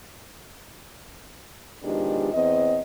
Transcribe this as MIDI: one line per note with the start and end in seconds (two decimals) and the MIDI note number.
1.83 2.30 47
1.83 2.30 51
1.83 2.30 53
1.83 2.30 56
1.83 2.30 62
1.83 2.30 67
2.33 2.80 40
2.33 2.80 60
2.33 2.80 75